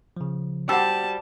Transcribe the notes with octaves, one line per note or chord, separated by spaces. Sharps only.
C#3 F3
G3 F#4 C5 F#5 G5 A5 E6